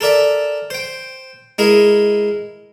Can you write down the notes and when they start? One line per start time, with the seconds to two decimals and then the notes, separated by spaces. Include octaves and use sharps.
0.01 A4 A#4 D5 E5
0.70 C5 G5
1.58 G#3 E4 G#4 A#4